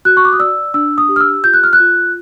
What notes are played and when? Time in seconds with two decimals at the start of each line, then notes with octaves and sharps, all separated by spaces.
0.05 F#4 F#6
0.17 C#6
0.25 D6
0.33 D#6
0.39 D5 E6
0.74 D4 E6
0.98 D#6
1.09 G4
1.16 F6
1.20 E6
1.44 F4 G6
1.54 F#6
1.64 F6
1.73 F#6
1.80 F4